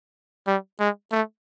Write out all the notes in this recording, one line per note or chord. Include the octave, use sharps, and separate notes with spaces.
G3
G#3
A3